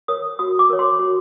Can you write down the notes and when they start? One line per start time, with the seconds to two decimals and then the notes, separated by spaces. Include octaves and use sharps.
0.08 A#4 C#5 D#6
0.39 F#4 D#6
0.59 D6
0.70 A#4 C#5
0.79 C6
0.99 F#4